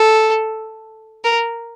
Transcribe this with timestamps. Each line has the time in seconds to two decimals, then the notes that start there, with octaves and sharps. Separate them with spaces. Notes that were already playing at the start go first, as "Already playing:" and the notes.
Already playing: A4
1.24 A#4